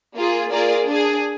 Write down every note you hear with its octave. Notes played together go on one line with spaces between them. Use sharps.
A#3 F4 G#4
A#3 F4 G#4 A#4 D5
D4 G#4